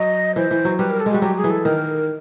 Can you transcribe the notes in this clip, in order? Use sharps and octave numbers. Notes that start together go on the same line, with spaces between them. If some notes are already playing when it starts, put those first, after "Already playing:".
Already playing: F#3 D#5
E3 C5
E3
F#3
G3 B4
A#4
A4
G#3
G3 F#4
F#3 G4
G#4
E3
A4
D#3 A#4